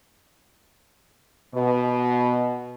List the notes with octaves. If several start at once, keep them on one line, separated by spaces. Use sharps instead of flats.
B2